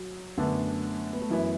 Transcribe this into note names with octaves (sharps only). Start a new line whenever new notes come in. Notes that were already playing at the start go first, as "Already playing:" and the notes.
Already playing: F#3
F#2 D3 A3 B3 D4
B3
A3
F#2 E3 F#3 B3 E4